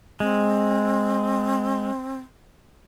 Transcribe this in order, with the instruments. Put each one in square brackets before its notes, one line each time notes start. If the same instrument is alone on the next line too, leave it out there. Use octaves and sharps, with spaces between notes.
[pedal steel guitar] G#3 [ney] C4